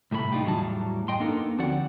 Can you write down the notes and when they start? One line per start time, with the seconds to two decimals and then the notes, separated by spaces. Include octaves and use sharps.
0.11 C2 A2 A3 C5 B5
0.32 G3 D4 D#4 F4 G4
0.45 E2 A2 E3 F#3 G3 A5
1.08 F#2 D#5 G5 C6
1.20 A#3 B3 D4 D#4 A4 A#4
1.58 D2 F3 C4 F#4 D5 F#5